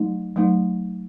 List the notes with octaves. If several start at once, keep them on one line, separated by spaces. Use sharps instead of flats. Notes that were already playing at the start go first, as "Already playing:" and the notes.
Already playing: F#3 A3 D#4
F#3 A3 D#4